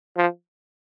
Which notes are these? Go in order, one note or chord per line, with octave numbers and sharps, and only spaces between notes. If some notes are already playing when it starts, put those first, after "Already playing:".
F3